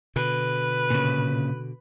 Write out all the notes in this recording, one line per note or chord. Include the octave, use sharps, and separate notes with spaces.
B2 D3 B4
A#2 C#3